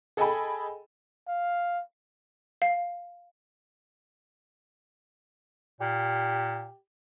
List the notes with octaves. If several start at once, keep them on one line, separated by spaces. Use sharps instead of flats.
G#4 A4 D#5 G5 G#5 B5
F5
F5
A#2 G4